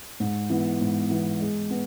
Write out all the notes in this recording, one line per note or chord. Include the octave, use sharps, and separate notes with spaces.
G#2
E3 B3
G#2
E3 B3
G#3
B3